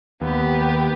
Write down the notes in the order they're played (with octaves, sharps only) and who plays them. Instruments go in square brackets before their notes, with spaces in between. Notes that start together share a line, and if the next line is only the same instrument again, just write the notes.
[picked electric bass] D#2 [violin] B3 G4